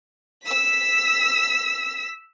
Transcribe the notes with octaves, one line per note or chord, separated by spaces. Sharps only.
E6 B6